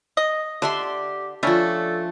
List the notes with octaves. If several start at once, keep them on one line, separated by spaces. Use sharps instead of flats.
D#5
D3 G4 D5 E5 C6
F3 G3 A3 C#4 D4 A4